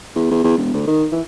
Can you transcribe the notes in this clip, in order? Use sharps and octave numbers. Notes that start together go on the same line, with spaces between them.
E2
E2
E2
E1
D2
D#3
E3